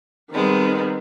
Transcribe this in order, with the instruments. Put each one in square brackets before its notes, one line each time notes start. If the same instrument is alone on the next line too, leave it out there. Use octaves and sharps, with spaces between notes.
[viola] D#3 C4 [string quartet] G3 G#3 B3